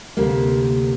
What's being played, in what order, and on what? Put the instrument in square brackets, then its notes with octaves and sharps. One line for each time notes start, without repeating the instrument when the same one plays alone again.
[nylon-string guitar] D2 C3 A#3